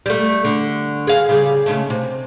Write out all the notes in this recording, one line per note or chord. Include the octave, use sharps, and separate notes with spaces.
G3 A3
D3
G#4 F5
C#3 G3 G#4
C#3 G#3 A3
C3